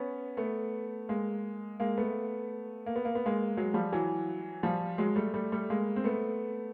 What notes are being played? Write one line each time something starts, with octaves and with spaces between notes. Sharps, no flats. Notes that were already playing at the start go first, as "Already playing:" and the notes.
Already playing: B3 C#4
A3 B3
G#3 A#3
G#3 A#3
A3 B3
A#3
B3
A#3
B3
G#3 A#3
F#3 G#3
F3 G3
E3 F#3
F3 G3
F#3 G#3
G3 A3
G3 A3
G3 A3
G#3 A#3
C4
A3 B3